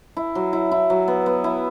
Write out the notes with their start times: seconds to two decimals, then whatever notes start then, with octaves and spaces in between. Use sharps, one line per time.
0.17 E4
0.35 F#3
0.53 E4
0.71 E4
0.90 F#3
1.08 B3
1.26 B3
1.44 E4